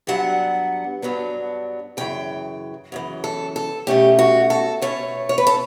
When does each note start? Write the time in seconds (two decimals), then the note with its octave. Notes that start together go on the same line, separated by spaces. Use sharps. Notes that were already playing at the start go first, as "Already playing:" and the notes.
0.07 G2 F#3 B3 D4 F#5
1.02 G2 F#3 B3 D4
1.97 F#2 C#3 E3 G5
2.92 F#2 C#3 E3
3.24 A4
3.56 A4
3.87 B2 A3 C#4 G4
4.19 F#4
4.50 A4
4.82 B2 A3 C#4 C#5
5.29 C#5
5.38 B4
5.47 A4